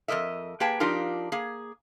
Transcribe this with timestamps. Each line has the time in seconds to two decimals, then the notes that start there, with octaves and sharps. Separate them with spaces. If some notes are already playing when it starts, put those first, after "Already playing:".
0.08 F2 G3 A#4 D#5 E5
0.60 A#3 G4 G#4 B4 G5 A5
0.80 F3 D4 D#4 F4 G4 A#4
1.32 A#3 G#4